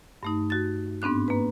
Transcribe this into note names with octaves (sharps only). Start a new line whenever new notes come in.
G2 A3 D#4
F#4 A6
G#2 B3 C4 D4 F#6
A#3 B4